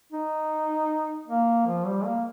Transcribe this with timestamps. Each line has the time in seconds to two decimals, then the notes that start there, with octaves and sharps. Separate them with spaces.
0.12 D#4
1.28 A#3
1.67 F3
1.86 G3
2.05 A#3